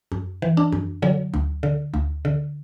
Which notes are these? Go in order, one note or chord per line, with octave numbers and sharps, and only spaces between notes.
F#2
E3
D4
F#2
D3 F#3
D2
D3
D2
D3